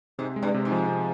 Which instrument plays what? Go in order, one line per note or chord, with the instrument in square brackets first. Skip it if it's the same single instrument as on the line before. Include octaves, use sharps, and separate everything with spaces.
[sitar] G#2 [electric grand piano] C3
[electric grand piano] G#3
[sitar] G2
[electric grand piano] C3
[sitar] G#2
[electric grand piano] F3
C3